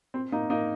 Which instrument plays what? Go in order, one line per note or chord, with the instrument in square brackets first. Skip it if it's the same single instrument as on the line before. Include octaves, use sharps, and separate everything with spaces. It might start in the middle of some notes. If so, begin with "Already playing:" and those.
[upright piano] C4
A#3 D#4
A#3 D#4